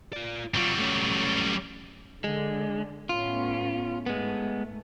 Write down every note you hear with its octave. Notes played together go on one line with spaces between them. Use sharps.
F4 D5
C3 F#3 G3 F4
A3 C#4
D3 G#3
A2 B3 C#4 F4
G#2 G#3 A3 B3